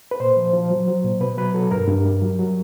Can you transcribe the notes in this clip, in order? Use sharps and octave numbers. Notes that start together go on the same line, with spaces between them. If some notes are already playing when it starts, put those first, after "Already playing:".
B4
A#2 C5
F3
F3
F#3
F#3
A#2
B2 B4
F#3 B4
F#3 A4
G2 A#4
G2
G3
F#3
F#3